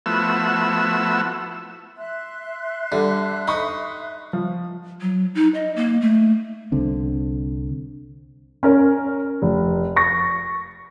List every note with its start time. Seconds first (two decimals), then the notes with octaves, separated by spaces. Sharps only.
0.06 F3 A3 B3 E4 F#4 E6
1.97 E5 C6 F#6
2.92 D3 G3
3.48 D#4 B5 C#6 D#6
4.33 F3
5.01 F#3
5.35 D#4
5.54 D#5
5.76 A#3
6.01 A3
6.72 C2 D3 C4
8.63 C#4 A#4 C#5
9.42 F1
9.96 C#6 A6 A#6